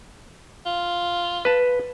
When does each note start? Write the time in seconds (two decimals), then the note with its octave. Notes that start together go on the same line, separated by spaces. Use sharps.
0.66 F4
1.45 B4 A5